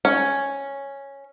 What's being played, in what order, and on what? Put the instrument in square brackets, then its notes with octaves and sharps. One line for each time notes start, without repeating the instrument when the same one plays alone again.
[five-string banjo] C#4